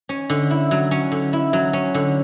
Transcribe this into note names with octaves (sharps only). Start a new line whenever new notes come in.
C#4
D3
E4
F#3
C#4
D3
E4
F#3
C#4
D3